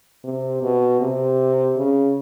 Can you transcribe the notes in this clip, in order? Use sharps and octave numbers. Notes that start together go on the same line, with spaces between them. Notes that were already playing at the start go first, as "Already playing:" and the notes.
C3
B2
C3
C#3